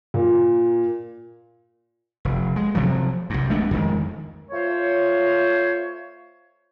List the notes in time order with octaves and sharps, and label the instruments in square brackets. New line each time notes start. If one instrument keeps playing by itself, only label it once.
[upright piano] A#2
[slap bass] F1
G#3
C3 F3 F#3
C2 G2
G#3 A3 B3 D4
F2 D#3 G#3
[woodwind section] A3 F4 C5 C#5